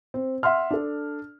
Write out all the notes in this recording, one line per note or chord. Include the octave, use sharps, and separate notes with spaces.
C4
E5 F#5 C6 F6
D4 A4